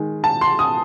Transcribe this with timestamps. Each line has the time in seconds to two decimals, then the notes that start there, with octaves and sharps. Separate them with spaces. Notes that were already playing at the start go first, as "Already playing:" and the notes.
Already playing: D#3 G#3
0.24 A5
0.41 C6
0.59 D#6